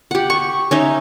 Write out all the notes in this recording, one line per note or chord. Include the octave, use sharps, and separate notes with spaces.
G4 F#5
C#6
C#4 D#4 E5